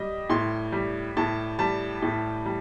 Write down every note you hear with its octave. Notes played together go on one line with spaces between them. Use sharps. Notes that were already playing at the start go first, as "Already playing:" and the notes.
Already playing: G3 D#5
A2 C6
G3
A2 A5
G3 A5
A2
G3